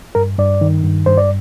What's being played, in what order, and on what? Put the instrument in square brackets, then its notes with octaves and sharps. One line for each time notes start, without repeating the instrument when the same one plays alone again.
[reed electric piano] G2 A#4
G2 D5
D#3
G2
G2 C5
D5